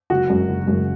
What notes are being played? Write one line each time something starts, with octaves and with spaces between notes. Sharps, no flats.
F#1 F#4
F#2 C#3
F#1
F#2 C#3